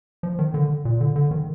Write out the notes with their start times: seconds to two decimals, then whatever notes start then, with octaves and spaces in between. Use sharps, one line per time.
0.23 F3
0.39 D#3
0.54 D3
0.85 A#2
1.01 D3
1.16 D3
1.31 D#3